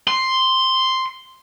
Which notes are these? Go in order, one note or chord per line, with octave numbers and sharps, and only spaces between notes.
C6